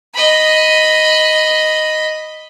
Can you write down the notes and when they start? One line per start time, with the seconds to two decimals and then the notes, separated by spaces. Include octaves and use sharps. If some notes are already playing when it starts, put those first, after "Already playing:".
0.14 D#5 B5